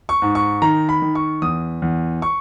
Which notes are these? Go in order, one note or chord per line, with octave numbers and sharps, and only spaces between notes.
C#6
G#2
C#6
D#3 A#5
B5
D#3
C#6
E2 D#6
E2
C#6